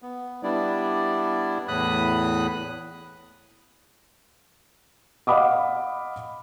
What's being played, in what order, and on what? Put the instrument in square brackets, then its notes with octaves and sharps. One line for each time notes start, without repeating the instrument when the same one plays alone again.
[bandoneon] B3
G3 B3 D4 E4 D5
E2 A2 B5 D#6 F#6
[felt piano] D#5 F5 F#5 B5 D6 D#6